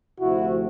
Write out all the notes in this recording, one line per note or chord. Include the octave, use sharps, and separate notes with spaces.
D2 C3 F3 A3 C4 E4 F#4